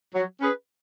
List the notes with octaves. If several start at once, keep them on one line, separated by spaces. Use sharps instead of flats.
F#3
C#4 G#4 B4